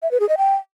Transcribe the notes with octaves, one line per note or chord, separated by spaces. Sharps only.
E5
B4
G#4
D#5
G5